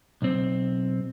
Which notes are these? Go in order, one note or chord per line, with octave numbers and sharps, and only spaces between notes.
B1 C4